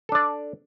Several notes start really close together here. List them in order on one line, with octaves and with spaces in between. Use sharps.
A4 D4 D5